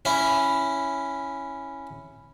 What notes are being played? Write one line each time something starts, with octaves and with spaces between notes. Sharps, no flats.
C#4 E4